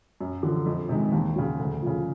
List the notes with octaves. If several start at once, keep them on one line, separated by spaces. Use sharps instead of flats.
F#2
D3 F3
F2
C3 D#3 G#3
D#2
C#3 F#3
D2
C#3 F3